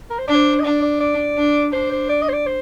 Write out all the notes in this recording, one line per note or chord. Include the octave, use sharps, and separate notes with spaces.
A#4
C5
D4 D5
C5
D#5
D4 D5
D5
D5
D4
D4 C5
C5
D5
D#5
C5
D5
C5